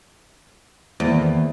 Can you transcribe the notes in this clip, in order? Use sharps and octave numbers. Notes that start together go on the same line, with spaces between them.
E2 D#3 A#3 D5